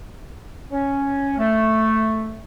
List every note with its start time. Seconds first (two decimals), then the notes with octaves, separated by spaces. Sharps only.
0.71 C#4
1.38 A3